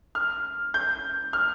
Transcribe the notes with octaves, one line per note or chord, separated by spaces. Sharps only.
F6
G6
F6